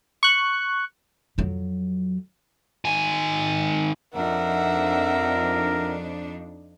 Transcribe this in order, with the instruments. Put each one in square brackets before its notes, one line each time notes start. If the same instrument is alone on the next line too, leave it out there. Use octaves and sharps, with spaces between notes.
[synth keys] C#6 F#6
[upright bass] F2 F#3
[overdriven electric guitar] D#3 G#5
[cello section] F2 D4 D#4 [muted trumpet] A#4 [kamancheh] E5 F#5